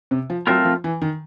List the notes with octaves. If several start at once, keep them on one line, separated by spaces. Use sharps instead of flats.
C3
F3
F#3 A3 C4 F4 A#4
F3
E3
D#3